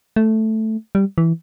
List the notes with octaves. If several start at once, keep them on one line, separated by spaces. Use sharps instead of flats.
A3
G3
E3